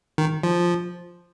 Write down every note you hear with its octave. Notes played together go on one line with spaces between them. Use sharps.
D#3
F3